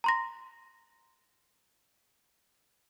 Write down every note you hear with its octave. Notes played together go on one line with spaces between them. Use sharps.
A#5 C6 A#6